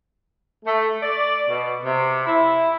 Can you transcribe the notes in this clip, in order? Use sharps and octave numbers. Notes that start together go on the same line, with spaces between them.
A3
D5
B2
C3
E4